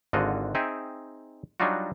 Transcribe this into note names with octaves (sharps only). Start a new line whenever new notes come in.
G#1 G#2 D3 F4 F#4 D#5
C4 D#4 G#4 E5 G5
F#3 G3 D4 D#4 F4 F#4